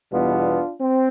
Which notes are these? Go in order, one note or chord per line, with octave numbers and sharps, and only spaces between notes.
E2 B2 G3 B3 D4 F4
C4